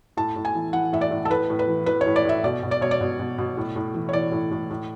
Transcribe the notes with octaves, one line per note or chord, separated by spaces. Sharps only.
A2 A5
A2
G#5
E3
E3 F#5
A2 E5
D5
A2
A4
A2 B4
A2
B4
E3
E3 B4
C#5
A2
D5
A2 E5
B2 D5
B2
D5
B2 C#5
D5
B2
B2
B2
A2
A2
E3
C#5
E3 D5
A2
A2
A2